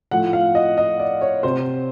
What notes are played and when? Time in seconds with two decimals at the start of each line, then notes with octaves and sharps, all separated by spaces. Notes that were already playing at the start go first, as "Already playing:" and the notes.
0.11 A2 F3 A3 F#5
0.33 F5
0.55 D#5
0.77 D#5
1.00 D5
1.21 C#5
1.43 C3 C5